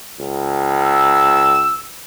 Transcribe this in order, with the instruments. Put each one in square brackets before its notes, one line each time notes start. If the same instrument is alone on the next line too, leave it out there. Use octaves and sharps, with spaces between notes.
[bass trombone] C#2
[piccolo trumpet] E6